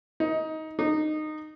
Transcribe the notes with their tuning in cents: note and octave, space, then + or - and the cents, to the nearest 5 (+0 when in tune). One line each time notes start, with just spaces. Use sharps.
D#4 +20
D#4 -15